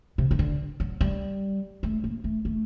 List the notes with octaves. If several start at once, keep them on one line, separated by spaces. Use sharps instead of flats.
C3
D#3
D3
F#3
G3
A3
A#3
A3
A3